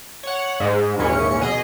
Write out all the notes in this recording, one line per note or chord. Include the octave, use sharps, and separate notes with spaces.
C#5 F#5
G#2
A#1 D#2 G#2 E3 C#4 C#7
B2 G#4 D#5